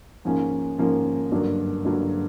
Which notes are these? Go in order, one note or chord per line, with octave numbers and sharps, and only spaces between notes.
G#2 F3 A#3 C#4
G#2 F3 A#3 C#4
G2 D3 F#3 A#3 D4
G2 D3 F#3 A#3 D4